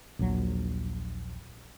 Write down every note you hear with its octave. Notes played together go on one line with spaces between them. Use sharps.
A#1 D#2 F#3